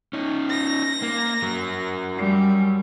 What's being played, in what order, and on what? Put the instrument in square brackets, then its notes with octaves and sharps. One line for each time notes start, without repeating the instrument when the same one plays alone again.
[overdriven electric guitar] C#4 D#4
[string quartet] A#6
[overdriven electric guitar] A#3
F#3 A#4
[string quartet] G3